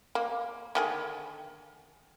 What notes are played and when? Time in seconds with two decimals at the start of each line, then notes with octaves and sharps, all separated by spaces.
0.15 A#3
0.75 D3 D#3 G#4